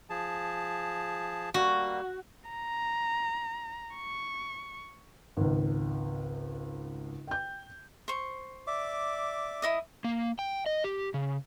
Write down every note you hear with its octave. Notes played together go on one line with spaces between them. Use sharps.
F3 G#4 A5
G3 A#3 F#4
A#5
C#6
G#1 C#2
G5 G6
C5 C#6
D5 E5 D6
E4 D#5 D#6
A#3
G5
D#5
G4
C#3